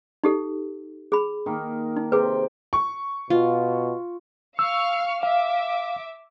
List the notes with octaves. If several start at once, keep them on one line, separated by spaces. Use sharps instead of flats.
D#4 G4 A4
G#4 B5
D#3 A#3
D#4
C3 G#4 B4 G5
C#6
B2 F4
F5 C#6 E6 F6
E5 F5 D6